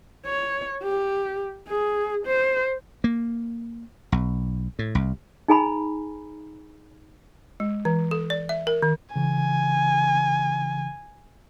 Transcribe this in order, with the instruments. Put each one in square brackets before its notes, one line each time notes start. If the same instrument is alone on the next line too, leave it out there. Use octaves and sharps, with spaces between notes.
[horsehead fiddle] C#5
G4
G#4
C5
[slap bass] A#3
B1
A2
C2
[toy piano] D#4 G#4 G#5 A#5 B5
[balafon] G#3
E3
A4
D5
E5
A#4
D#3
[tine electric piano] C#3 E3 [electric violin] G#5